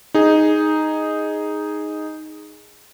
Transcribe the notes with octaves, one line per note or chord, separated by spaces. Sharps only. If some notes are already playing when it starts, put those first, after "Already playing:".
D#4 G#4